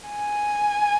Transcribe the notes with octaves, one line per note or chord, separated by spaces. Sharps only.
G#5